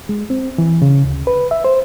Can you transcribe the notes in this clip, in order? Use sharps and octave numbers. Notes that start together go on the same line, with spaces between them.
G#3
C4
E3
C#3
D2
B4
E5
C5